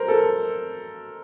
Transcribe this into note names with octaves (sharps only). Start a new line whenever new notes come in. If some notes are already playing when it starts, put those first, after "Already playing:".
Already playing: A#4 C5
A4